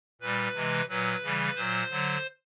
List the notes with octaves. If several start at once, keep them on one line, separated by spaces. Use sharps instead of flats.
A#2 G3 B4
C3 E3 G#3
A#2 F#3 B4
C#3 E3 G3
A#2 F#3 C5
D3 F#3